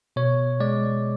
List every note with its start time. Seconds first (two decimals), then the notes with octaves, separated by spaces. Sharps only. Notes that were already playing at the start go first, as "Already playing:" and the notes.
0.16 B2 C#5
0.60 G#3 D5